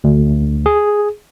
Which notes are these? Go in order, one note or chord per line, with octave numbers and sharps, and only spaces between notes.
D2
G#4